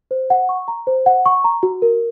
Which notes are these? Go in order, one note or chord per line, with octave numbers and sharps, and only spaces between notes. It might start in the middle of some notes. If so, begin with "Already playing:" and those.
C5
F#5
C#6
A#5
C5
F#5
C#6
A#5
F#4
A#4